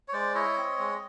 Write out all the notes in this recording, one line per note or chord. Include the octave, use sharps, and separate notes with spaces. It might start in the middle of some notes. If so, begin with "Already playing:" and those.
C#5
G#3 C5 D5
E4 C#5 D#5
C4
G#3